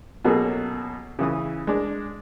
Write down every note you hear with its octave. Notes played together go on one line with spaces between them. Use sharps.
B2 F#3 A#3 C#4 G#4 A4
C#3 E3 D#6
G#3 D4